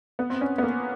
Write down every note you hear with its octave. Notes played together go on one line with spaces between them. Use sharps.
B3
C4
C#4
B3
A#3